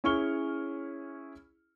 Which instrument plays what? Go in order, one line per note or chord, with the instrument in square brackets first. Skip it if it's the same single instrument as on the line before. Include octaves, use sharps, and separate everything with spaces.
[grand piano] C#4 E4 G#4 C#6 F6 G7